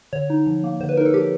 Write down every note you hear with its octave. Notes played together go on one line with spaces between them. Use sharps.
D3 C#5
D#4
F3
A#3
D3 C5
B4
D#4 A#4
A4
F3 G4